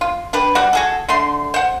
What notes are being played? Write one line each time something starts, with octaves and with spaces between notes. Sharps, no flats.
F4
D4 G4 B4
G3 F#4 D5 F#5
F#4 G#4 A4
D3 A3 C6
C5 F#5